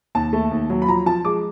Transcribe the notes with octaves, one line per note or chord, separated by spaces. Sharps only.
D#2 A5
A3
D#2
F#3
B5
F3 A#5
F3 A5
G#3 D6